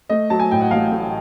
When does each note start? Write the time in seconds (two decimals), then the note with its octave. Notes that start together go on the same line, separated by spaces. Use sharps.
0.10 A3 D#5
0.30 F#3 A5
0.40 G#5
0.51 A2 G5
0.61 F#5
0.71 A1 F5
0.92 A3